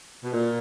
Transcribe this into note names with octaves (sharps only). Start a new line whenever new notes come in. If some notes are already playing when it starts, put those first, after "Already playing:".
B2
A#2